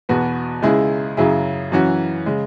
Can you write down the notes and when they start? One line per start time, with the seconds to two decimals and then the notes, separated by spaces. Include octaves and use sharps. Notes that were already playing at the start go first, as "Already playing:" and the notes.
0.09 E2 B2 B3 F#4
0.62 C#2 C#3 G#3 E4 G#4
1.17 F#2 C#3 F#3 E4 G#4
1.72 F#2 E3 C#4 F#4
2.26 C#3 G#3